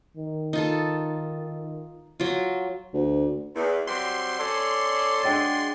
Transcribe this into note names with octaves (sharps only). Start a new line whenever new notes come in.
D#3
D#4 F4 A4
F#3 F4
D2
E2
F#3 G3 C4 C6
C#4 A4 D5
F#3 G#3 D4 G5 A6